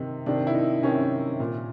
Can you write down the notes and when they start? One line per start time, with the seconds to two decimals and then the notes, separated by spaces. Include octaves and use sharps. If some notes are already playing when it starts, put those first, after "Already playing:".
Already playing: C3 D#3 D#4
0.26 C3 D#3 D4
0.47 E4
0.54 D#4
0.83 C3 D#3 C#4
1.40 A#2